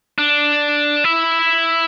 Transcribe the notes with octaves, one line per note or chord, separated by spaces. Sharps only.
D4
E4